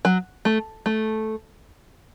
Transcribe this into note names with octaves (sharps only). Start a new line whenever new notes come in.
F#3
A3
A3